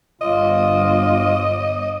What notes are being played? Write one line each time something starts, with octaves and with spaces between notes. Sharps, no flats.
G1 F4 D#5